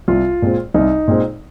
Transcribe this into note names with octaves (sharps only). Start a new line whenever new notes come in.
C2 F4
A#2 G#3 C4
C2 D#4
A#2 G#3 C4